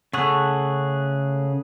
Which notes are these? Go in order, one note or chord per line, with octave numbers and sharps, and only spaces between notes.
C#3 A3 G#4 F#5